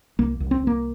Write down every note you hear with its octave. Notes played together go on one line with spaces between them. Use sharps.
C2 A#3
C2
C4
C2
A#3